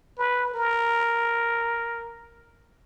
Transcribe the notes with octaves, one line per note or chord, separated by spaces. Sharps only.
B4
A#4